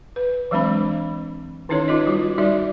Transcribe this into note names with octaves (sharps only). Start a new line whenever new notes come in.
B4
E3 F#3 G#3 C4 D4 B5
D#3 C#4 D#4 E4 A4 C#5
D#4 F4 A4 D#5
G3 F4 F#4
G3 D#4 F#4 A4 D5 E5